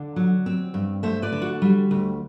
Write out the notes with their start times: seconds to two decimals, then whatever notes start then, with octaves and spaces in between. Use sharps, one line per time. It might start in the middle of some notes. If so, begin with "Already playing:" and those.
Already playing: D3 D5
0.16 F#3
0.46 C4
0.74 G2
1.03 A3 C5 E5
1.22 B4 D5
1.32 D3
1.42 F#4
1.62 G3
1.91 D2